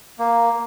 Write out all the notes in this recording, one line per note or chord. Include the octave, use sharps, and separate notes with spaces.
A#3